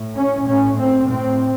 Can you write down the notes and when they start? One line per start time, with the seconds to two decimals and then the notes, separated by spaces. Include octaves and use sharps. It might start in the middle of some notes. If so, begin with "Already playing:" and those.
Already playing: A2
0.16 C#4
0.47 A2 C#4
0.79 C4
1.09 A2 C4